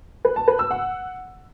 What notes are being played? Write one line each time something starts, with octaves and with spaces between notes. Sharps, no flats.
B4
A5
B4
E6
F#5